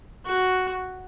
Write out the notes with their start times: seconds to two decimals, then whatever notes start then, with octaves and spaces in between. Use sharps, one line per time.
0.25 F#4